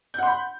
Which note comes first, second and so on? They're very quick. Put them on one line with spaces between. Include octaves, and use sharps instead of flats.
G6 F#5 C6 B5